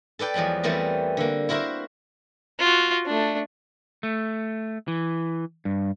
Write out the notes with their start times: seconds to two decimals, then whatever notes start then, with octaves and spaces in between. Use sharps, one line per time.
0.19 A4 B4 D5 G5
0.34 E2 F3 F#3 G#3 B5
0.63 E3 G3 A3 B3 C4 A#4
1.17 D3 A#3
1.49 E4 F#4 A#4 C5 E5
2.60 F4 F#4
3.06 A3 D4
4.03 A3
4.88 E3
5.65 G2